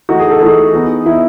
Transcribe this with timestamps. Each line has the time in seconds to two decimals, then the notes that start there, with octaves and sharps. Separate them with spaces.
0.09 E3 A3 D#4 F#4
0.20 G#4
0.30 A4
0.41 E3 A3 D#4 G#4
0.74 E3 B3 D#4
1.05 E3 B3 D#4 E4